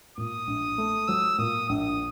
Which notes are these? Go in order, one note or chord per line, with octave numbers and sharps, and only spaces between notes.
A#2 D#6
A#1
A3
F#3 E6
A#2 D#6
A#1 D#6